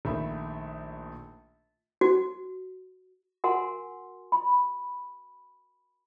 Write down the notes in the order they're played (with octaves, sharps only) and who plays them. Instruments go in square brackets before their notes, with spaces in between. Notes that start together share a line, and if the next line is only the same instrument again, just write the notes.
[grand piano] A#1 D#3 A3 E5 B5
[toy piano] F#4
F#4 A#4 F#5 G#5 C6
B5